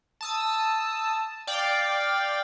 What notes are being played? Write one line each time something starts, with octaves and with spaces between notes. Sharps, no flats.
A5 D#6 E6
D5 F5 G5